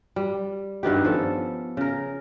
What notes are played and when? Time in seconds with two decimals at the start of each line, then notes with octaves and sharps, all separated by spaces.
0.16 G3
0.83 G2 D#3 B3 G4
1.05 F3 C#4 A4
1.77 C#3 A#4